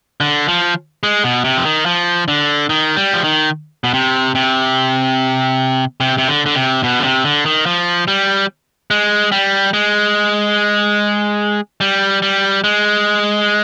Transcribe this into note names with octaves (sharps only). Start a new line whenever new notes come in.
D3
F3
G#3
B2
C3
F3
D#3
F3
D3
D#3
G3
F3
D#3
B2
C3
C3
C3
C3
D3
D3
C3
B2
D3
C3
D3
D#3
F3
G3
G#3
G3
G#3
G3
G3
G#3